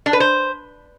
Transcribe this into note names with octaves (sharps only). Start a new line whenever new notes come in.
D4
B4
C5